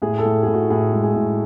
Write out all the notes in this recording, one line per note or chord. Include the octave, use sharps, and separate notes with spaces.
A2 G#4
A4
A2
A2 G#4
F#4
A2 G#4
G#3
G#4
A2